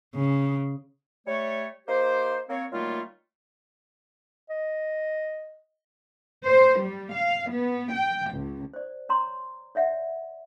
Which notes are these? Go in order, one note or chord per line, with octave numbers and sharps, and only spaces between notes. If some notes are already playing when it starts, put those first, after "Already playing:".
C#3
G3 A3 C#5
A#3 D#4 G4 C5
A#3 C4 C#5
D#3 F#3 G3 A3 A#3 F4
D#5
C5
G3
F5
B3
G5
C#2
C5 D5
C#5 A#5 C6
C#5 D5 E5 F#5